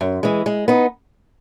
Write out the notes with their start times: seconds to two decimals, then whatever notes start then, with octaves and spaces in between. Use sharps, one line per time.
0.01 F#2
0.23 E3 G#3
0.46 G#3
0.68 B3 D#4